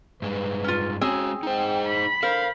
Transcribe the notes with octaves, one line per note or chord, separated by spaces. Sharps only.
G2 G#3 B4
C#4 F4
G#3 C4 C#4 F#4 G#4 G#5
G#3 D#4 C5 G5
B5
D3 A#4 C5 F5